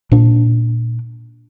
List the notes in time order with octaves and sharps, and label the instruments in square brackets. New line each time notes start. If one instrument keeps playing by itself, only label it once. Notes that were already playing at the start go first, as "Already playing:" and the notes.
[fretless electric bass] A#2 D4